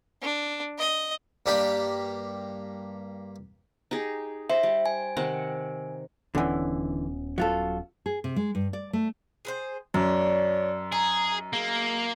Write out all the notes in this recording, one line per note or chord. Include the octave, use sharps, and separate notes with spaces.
D4
D#5
G2 A#3 D4 G4 B5
D#4 G4 G#4
C5 E5
G3
G#5
C3 D#3 F#5
D#1 D3 E3 B3 C#4
F#3 F4 A4
G#4
C3
G#3
G2
D5
A3
G#4 B4 C5
F#2 D4 C#5
D#4 G#4 A#5
A#3 G#4